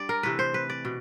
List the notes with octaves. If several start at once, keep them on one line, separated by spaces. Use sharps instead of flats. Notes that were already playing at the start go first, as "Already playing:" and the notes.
Already playing: G3 D4 D5
A#4
C3 E3 A3 B4
C5
B4
D5
B2